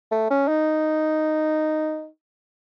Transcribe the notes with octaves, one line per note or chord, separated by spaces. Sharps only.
A3
C#4
D#4